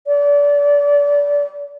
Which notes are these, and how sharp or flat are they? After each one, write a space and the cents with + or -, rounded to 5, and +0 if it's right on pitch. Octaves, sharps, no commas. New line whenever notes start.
D5 -30